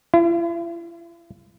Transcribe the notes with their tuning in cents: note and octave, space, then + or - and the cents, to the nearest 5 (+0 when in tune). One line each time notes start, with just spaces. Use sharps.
E4 +45